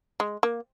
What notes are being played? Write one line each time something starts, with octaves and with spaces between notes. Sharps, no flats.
G#3
A#3